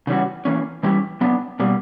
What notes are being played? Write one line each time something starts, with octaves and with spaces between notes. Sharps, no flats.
C#3 E3 G3 C#4 F#4
E3 A#3 C#4
E3 G3 C#4 E4 G4
F#3 B3 D4
B2 G3 A#3